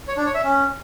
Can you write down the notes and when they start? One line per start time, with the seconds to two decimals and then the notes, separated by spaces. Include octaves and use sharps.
0.08 C#5
0.17 D4
0.26 C#5
0.35 E5
0.44 C#4